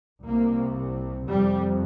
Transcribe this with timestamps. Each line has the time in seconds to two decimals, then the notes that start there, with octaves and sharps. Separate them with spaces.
0.25 C2 C3 A#3
1.27 F2 C3 G3